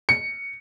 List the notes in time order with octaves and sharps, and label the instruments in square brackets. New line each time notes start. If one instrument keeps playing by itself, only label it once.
[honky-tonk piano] C#7